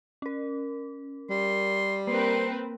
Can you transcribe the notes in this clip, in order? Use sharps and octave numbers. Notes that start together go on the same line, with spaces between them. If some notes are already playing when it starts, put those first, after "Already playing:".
C#4 A#4
G3 C6
A#3 C4 A#4 B4 C6